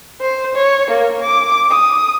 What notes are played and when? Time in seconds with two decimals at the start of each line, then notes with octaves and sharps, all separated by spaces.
0.21 C5
0.55 C#5
0.90 A#3
1.22 D6
1.70 D#6